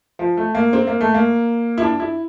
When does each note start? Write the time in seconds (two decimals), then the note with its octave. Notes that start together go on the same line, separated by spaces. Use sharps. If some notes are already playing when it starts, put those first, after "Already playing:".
0.19 F3
0.37 A3
0.55 A#3
0.73 C4
0.87 A#3
1.01 A3
1.14 A#3
1.78 E4
1.82 D4
2.00 E4